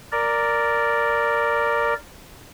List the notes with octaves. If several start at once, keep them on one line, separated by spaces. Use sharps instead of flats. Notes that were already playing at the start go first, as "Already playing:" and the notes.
A#4 D5